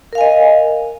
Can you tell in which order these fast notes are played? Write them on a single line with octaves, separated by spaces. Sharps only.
A#4 F5 G#5 D#5